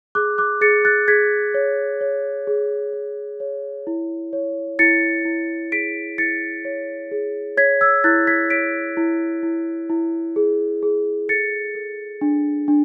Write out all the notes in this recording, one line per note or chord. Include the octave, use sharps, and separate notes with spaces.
G#4 D6 F#6
D6 F#6
G#4 A6 C#7
F#6 A6
G#4 G#6 B6
C#5
C#5
G#4
C#5
C#5
E4
C#5
E4 A6 C#7
E4
G#4 B6 D7
E4 A6 C#7
C#5
G#4
C#5 G#6 B6
E6 G#6
E4 F#6 A6
G#6 B6
C#5 B6 D7
E4
E4
E4
G#4
G#4
A4 A6 C#7
A4
D4
D4